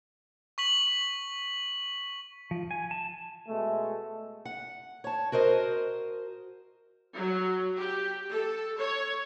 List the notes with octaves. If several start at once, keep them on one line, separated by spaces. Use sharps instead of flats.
C#6 B6 F#7
F3
G#5
A5
B2 G#3 A3
F#5
C#5 A5
F#4 A#4 C5 D#5
F#3
G4
A4
C#5